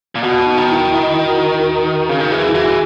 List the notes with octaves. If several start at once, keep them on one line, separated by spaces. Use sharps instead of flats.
A#2
B2 F#4
D#4
D#3
E4
E4
F#4
C#3
D#3
E3 G#4
E4
E3 F#4